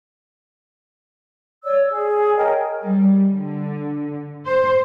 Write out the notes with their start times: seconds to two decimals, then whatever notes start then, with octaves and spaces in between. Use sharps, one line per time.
1.64 C#5 D5 E6
1.90 G#4
2.36 A#4 C#5 D#5 G5
2.85 G3
3.32 D3
4.45 C5